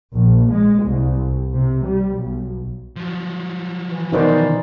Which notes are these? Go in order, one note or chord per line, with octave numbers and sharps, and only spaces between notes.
A#1
G#3
C2
C3
G3
B1
F3 F#3
E3
B2 D#3 B3 D#4 C5 D5